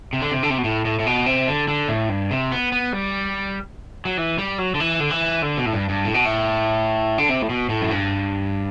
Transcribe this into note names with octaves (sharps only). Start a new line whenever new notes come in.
C3
D3
C3
D3
C3
B2
A2
A2
A2
B2
C3
D3
D3
A2
G2
C3
B3
B3
G3
F#3
E3
G3
F#3
D3
E3
D3
E3
D3
B2
A2
G2
G2
A2
B2
A2
D3
C3
A2
B2
A2
F#2
G2